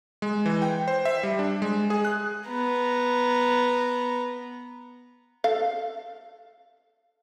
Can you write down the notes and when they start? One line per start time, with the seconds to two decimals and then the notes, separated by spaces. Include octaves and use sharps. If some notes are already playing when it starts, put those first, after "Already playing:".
0.22 G#3
0.46 E3
0.62 G5
0.88 C5
1.05 E5
1.23 G3
1.39 D4
1.62 G#3
1.90 G#4
2.05 F#6
2.48 B3 A#5
5.44 A4 F5